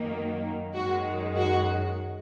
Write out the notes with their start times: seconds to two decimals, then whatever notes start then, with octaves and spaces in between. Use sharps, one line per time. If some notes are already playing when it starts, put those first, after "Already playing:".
Already playing: F#2 D#3 F#3 A#3
0.74 F#2 D#3 G#3 F#4
1.36 F#4